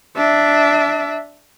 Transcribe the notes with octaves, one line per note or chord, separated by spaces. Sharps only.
D4 E5